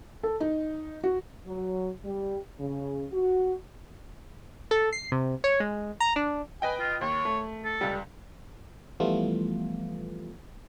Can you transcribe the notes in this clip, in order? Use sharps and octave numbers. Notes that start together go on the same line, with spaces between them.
A4
D#4
F#4
F#3
G3
C#3
F#4
A4
C7
C3
C#5
G#3
A#5
D4
B4 D#5 G5 G#5
F4
D#2 C#5
A3
A4
C#2 G3
E3 F3 G3 A3 B3 F4